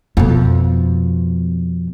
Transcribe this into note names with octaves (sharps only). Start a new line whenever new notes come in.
F2 B2